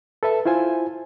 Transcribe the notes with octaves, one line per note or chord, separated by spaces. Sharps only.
A4 B4 E5 A5
E4 F4 C5 G#5